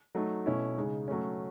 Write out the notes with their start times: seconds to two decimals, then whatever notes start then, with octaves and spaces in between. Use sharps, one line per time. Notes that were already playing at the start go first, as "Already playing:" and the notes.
0.15 F#3 A3 D#4
0.46 B2 A3 C#4 E4
0.77 C#3 G#3 D#4
1.08 F#3 A3 C#4